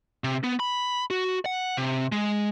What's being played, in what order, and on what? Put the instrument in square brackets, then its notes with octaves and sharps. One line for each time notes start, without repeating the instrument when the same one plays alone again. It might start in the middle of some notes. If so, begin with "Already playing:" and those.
[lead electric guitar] C3
B3
B5
F#4
F#5
C3
G#3